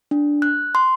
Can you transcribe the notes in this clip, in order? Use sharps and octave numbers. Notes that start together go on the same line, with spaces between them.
D4
F#6
C6